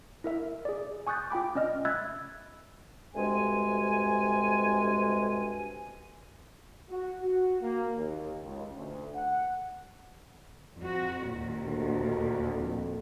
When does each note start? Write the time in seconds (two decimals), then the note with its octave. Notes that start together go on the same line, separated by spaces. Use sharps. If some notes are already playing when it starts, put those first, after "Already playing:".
0.24 E4 A#4 E5
0.65 G#4 D5
1.07 G#5 C#6 D#6 F#6 G6 A6
1.30 F4 G5 B5 D6
1.55 C#4 D5 D#5 F6
1.85 E5 B5 E6 F#6 G#6 A6
3.15 D2 G2 C3 G#3 G#5
6.90 F#4
7.22 F#4
7.62 A#3
7.97 D#2
8.43 C#2
8.76 D2
9.15 F#5
10.76 F2 F#4
11.27 D#2 A#2
11.65 D2
12.57 F2